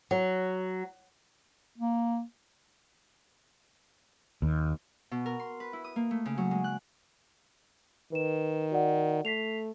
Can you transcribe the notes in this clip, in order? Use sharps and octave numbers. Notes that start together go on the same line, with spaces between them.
F#3
A#3
D#2
B2
A#4
C6
B4
E4
D#6
A#3
A3
C#3
F#3
G#3
F#6
D#3 B4 E7
F#4 D5 F#5
A3 B6 C7 F7